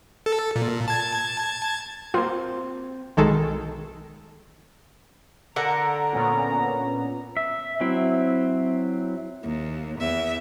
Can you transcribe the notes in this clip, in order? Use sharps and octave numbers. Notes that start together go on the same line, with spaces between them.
A4
A#2
A5 G#6
A#3 C4 F4
B1 D#3 G#3 A4
D3 A#4 F#5 A#5
A#2 B3 C#4
E5
F#3 C4 E4
D#2
E2 E5